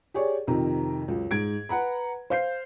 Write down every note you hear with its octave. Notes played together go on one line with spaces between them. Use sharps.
G4 G#4 C#5 D5
F2 C3 D#3 A#5
C#2 F#2
G#2 G#6 D7
B4 F#5 A#5 B5
C5 F5 G6 C7